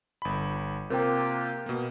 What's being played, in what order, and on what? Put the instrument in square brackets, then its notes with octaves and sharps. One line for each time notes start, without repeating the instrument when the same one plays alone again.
[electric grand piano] G1 B5
[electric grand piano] C3 C4 [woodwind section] A#3 F4 G4 [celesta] A#4 G5
[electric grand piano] B2 A#3